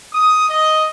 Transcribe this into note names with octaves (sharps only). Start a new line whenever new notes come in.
D#6
D#5